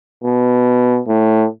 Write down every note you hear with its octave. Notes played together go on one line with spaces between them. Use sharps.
B2
A2